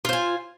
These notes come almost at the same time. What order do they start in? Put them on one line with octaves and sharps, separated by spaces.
F4 C5 G#5